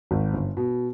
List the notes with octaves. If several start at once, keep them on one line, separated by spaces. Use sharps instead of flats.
G#1
G1
B2